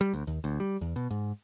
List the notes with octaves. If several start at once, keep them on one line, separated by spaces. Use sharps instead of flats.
G3
D2
D#2
D2
G3
E2
B2
G#2